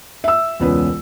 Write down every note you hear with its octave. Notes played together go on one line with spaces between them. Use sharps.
E5 E6
E1 C#2 B3 C#4 B4